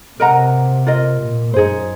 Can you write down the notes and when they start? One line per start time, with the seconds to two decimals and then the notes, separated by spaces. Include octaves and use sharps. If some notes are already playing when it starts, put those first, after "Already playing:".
0.20 C3 A#4 D#5 F#5 A#5
0.87 F4 A#4 D#5
1.21 A#2
1.53 F#2 D#4 G#4 C5